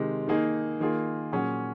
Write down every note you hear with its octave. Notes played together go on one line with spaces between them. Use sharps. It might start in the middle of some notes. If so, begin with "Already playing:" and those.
Already playing: C3 D#3 G#3
D#3 A#3 D#4 G#4
D#3 A#3 F4 G#4
A#2 F#3 C#4 G#4